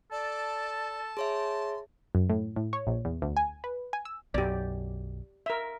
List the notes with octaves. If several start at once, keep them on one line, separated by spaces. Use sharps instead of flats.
A4 D5 A5
G#4 C#5 E5 C6
F#2
A2
A2
C#5
A#1
E2
D2
G#5
B4
G#5
E6
B1 F#2 G4 D5
A#4 E5